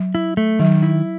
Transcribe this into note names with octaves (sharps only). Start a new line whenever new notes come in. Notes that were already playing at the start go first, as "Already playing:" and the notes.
Already playing: F#3
E4
A3
D#3 F#3
E4